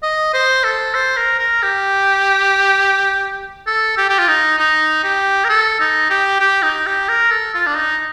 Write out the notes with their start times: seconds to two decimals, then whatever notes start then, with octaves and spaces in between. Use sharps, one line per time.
0.03 D#5
0.34 C5
0.64 A4
0.94 C5
1.17 A#4
1.39 A#4
1.63 G4
3.67 A4
3.98 G4
4.10 G4
4.19 F4
4.28 D#4
4.59 D#4
5.04 G4
5.44 A#4
5.49 A4
5.80 D#4
6.10 G4
6.40 G4
6.63 D#4
6.86 G4
7.08 A#4
7.30 A4
7.54 F4
7.66 D4
7.77 D#4